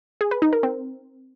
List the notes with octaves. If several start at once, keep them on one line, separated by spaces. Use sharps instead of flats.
G#4
B4
D#4
A#4
C4